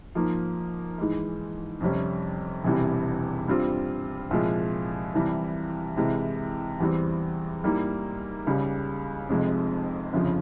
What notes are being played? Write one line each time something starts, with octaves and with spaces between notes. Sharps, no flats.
G#2 F3 A#3
G#2 E3 G#3
F2 C3 G3 C#4
E1 E2 C3 E3 G3
G2 G3 C4 F4
C2 A#2 F3 G#3
C2 C3 E3 G3
C2 C3 E3 G#3
E2 E3 G3 C4
G#2 G3 A#3 E4
C#2 C#3 G3
F1 F2 C3 F3 G#3
G1 F2 C#3 F3